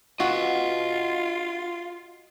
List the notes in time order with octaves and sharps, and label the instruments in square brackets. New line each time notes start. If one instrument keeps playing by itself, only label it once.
[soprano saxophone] F4 [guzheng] F#4 [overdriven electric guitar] D#5 F#5